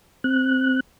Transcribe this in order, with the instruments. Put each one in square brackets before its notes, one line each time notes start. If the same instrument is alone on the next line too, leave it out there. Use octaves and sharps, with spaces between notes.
[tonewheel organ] C4 F#6